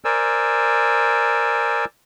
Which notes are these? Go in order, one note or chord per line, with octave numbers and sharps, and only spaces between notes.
A#4 C5 D5 G#5 E6